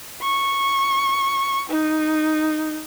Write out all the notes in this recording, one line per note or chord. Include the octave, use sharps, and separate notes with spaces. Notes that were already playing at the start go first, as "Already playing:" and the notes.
C#6
D#4